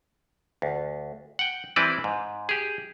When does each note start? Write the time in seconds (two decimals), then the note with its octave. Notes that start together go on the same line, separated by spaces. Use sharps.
0.62 D2
1.39 F#5 G5
1.76 E3 G3 C4 E4 B4 D5
2.04 G#2
2.49 G4 G#4